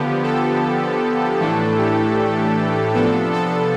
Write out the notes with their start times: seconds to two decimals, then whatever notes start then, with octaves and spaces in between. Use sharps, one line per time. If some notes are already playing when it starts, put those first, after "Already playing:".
Already playing: D3 F3 B3 G4
0.24 A4
1.40 A2 E3 A3 D4
1.78 G4
2.94 C3 F3 B3 D4 A4
3.33 A4